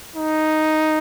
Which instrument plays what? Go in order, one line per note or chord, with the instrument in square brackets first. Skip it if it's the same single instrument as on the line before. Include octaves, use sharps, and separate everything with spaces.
[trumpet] D#4